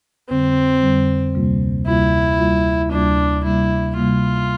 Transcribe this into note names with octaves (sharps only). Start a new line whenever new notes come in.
F2 D3 G3 C4
F2 D3 G3
D2 C3 G3 A#3 F4
D2 C3 G3 A#3 E4 F4
D2 C3 G3 A#3 F4
D2 C3 G3 A#3 D4 F4
C3 G3 A#3 E4
C3 G3 A#3 F4